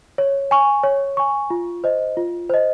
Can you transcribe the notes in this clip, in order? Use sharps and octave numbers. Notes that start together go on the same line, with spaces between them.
C#5
G#5 C#6
C#5
G#5 C#6
F4
C5 D#5
F4
C5 D#5